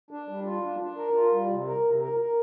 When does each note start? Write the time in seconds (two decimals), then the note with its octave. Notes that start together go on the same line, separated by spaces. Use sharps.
0.11 D4
0.29 G3
0.46 F4
0.63 D4
0.80 D4
0.97 A#4
1.16 F4
1.32 G3
1.49 C3
1.67 A#4
1.85 C3
2.02 A#4
2.20 A#4